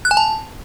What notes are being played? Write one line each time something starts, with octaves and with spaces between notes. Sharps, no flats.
F#6
G#5
A5